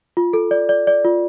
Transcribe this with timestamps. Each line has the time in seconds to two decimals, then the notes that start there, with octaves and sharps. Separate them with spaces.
0.17 F4
0.33 A4
0.51 D5
0.69 D5
0.87 D5
1.05 F4